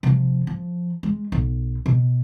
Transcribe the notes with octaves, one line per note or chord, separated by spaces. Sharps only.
C3 F3
F3
G#3
B1
B2